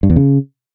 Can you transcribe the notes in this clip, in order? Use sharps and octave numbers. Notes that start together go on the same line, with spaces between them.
G2
E2
C#3